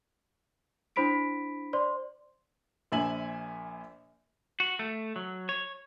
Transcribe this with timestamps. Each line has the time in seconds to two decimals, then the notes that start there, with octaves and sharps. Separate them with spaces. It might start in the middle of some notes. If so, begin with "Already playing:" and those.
0.96 D4 E4 C5 B5 B6 D7
1.73 C5 D5 C6
2.92 A#1 A#2 E5 G#5 F#7
4.60 F#4
4.79 A3
5.16 F#3
5.49 C#5